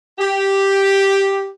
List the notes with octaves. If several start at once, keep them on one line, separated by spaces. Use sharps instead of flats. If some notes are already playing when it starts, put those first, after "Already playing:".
G4